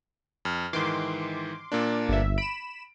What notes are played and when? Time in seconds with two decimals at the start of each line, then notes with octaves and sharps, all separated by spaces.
0.45 F2 F6
0.73 G#2 D#3 E3 C6 D6
1.72 A#2 A#3 D4
2.08 G1 E5
2.38 B5 D7 E7